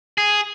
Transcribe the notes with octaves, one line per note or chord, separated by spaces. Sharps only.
G#4